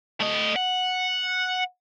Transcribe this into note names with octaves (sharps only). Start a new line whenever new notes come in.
A3 D#5
F#5